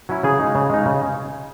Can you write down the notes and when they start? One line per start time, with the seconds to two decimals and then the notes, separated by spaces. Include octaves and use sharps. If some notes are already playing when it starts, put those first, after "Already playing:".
0.09 F#3 C#4 E4
0.23 C#3 G#4
0.39 G#3 D#4
0.55 C#3
0.69 G#3 D#4
0.86 C#3